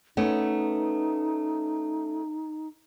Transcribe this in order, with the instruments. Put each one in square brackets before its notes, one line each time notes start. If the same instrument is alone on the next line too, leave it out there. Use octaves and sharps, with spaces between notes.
[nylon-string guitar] A3 B3 C#4 [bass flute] D#4